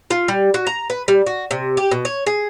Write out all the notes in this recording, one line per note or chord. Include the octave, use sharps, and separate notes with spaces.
F4
G3
F#4
A#5
B4
G3
F#4
C3
G4
B2
C#5
G#4